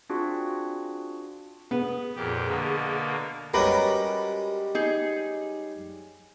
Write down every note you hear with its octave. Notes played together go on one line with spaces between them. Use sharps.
C4 D4 F4 F#4 G#4
B3 G#4
F2 A#2 G4
B2 D3 A#3
G3 G#3 C#4 F#4 A#4 B4
D#4 G#4